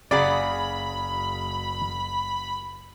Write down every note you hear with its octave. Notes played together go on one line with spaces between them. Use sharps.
F#1 C#3 F#3 G#4 D5 B5